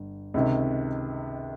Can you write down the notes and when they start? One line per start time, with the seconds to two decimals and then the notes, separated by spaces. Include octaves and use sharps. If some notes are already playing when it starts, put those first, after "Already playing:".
Already playing: G1
0.34 C#2 C3 D#3